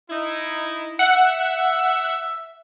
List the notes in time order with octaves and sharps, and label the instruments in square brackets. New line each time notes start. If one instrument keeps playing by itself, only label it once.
[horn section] D#4 E4
[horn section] E5 [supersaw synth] F#5